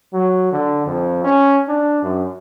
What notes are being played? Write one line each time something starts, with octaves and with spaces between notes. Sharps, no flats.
F#3
D3
F2
C#4
D4
F#2